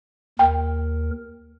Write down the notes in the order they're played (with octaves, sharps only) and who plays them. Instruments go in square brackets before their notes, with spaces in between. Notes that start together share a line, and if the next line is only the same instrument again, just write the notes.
[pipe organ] D#2 A#4 [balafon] G5